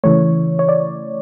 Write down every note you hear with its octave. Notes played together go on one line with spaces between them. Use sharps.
C#3 E3 A3 C#5
C#5
D5